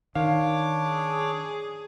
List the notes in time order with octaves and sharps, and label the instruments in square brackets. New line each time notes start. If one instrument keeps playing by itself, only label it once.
[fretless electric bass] D#3 [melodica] D4 C#5 D6 [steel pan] F5
[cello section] G#4